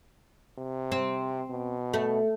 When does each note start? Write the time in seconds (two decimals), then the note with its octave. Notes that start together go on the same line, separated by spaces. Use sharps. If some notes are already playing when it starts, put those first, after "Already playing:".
0.58 C3
0.92 C4
1.50 B2
1.94 A3